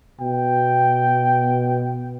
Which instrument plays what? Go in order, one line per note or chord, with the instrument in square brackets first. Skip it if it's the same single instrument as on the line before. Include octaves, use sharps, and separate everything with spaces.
[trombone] B2 [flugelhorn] G5